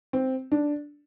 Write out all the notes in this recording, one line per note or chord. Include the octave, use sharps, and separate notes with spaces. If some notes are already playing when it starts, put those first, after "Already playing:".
C4
D4